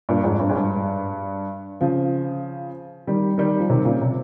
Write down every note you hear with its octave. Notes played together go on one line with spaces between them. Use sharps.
G2 A#2
F2 G#2
G2
G#2
G2
C#3 F3
D#3 G3
D#3 G3
F3
C3 D#3
A#2 C#3
C3